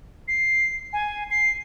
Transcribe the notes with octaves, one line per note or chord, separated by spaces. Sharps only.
C7
G#5
C7